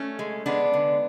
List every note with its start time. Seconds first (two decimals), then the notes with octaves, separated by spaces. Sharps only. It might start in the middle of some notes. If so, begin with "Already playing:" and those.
Already playing: A3 C#4
0.19 G#3
0.46 G#3 B3 D4
0.74 D3